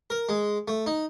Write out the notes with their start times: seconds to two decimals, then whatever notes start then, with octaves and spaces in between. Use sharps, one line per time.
0.10 A#4
0.29 G#3
0.68 A3
0.86 D#4